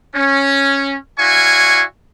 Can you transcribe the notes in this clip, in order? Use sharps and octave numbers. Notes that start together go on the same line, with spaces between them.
C#4
E4 F#4 D5 F5 G#5 C#6